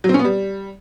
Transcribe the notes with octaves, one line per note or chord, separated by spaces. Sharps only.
F#3
C4
C#4
B3
G3